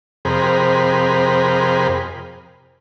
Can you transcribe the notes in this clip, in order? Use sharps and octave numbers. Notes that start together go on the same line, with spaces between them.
F2 C3 G#4 A#4 C5 B5